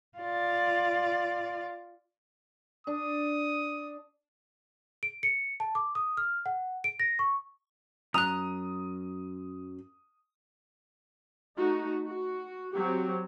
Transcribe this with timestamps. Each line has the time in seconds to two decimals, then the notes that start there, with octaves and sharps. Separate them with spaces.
0.18 F4 D5
2.87 D4 D#6
5.03 D7
5.23 C#7
5.60 A5
5.75 D6
5.95 D#6
6.17 F6
6.46 F#5
6.84 D7
7.00 A#6
7.19 C#6
8.14 F#2 A#5 D#6 F#6
11.55 A3 D#4 F#4
12.07 F#4
12.73 F#3 C4 F#4 G4